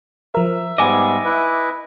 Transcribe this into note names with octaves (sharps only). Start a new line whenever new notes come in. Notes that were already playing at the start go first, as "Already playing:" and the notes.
F3 A#4 E5
G#2 G3 B3 D#5 G#5 D6
E4 B4